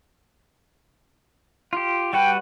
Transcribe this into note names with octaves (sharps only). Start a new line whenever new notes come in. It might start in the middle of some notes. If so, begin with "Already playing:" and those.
F4 G4
G3 F#4 B4 G5